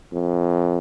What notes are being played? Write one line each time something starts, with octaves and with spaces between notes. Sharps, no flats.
F2